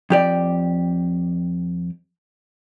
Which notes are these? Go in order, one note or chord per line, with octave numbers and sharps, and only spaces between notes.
F2 G4 D5